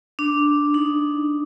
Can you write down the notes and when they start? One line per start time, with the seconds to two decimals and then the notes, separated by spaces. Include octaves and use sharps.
0.19 D4
0.74 D#4